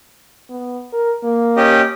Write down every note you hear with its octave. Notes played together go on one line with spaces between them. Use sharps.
B3
A#4
A#3
C#4 G4 D#5